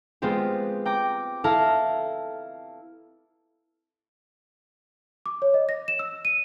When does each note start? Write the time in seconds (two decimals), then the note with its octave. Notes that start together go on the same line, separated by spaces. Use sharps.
0.22 G#3 B3 C4 F4 G4
0.86 G5 A#5 D6
1.44 E4 A4 F5 A5 A#5
5.26 D6
5.42 C#5
5.54 D#5
5.69 A#6
5.88 E7
5.99 E6
6.25 D#7